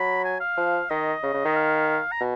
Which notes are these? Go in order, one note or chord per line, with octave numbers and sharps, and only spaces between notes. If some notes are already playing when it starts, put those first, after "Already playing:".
Already playing: F#3 B5
G#5
F5
F3
D#3 D#5
C#3
C#3
D#3
F5
A#5
B2